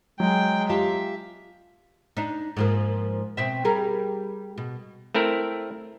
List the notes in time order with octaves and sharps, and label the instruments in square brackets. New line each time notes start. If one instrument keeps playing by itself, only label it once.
[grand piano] F#3 [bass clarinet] G#3 [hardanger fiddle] G#4 G5
[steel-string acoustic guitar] F4 G4 A5 [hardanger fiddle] E5
[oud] D4 D#4
G#2 F3 A#3
B2 C4 E5
G3 G#4 A#4
B2
[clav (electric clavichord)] A3 C4 E4 A#4